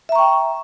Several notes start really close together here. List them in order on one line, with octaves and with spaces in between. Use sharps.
E5 A#5 C#6 G5